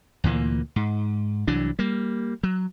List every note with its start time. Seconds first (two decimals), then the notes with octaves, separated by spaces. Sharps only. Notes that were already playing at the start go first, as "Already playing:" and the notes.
0.24 D2 A#2 E3 A#3
0.76 G#2
1.47 C2 E3 F#3 D4
1.79 G3 A#3
2.43 F#3